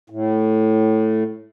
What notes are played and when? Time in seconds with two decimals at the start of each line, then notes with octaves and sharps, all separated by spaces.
0.10 A2